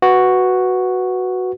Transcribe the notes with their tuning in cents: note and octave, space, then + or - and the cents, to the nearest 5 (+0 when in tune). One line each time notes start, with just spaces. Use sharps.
F#4 +0 B4 +0